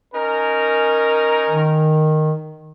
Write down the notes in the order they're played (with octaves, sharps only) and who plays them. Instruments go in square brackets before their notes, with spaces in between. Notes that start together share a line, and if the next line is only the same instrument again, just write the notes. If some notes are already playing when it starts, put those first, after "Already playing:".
[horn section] C#4 D#4 A#4
[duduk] D#3